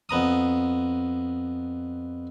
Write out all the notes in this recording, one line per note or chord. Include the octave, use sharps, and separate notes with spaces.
F2 B3 A#5 D#6